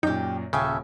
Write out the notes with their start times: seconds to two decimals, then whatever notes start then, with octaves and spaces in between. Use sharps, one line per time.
0.03 F#2 A#2 D#4 G4 G5
0.53 D#1 C#3 A4 C#5 E5 G5 G#5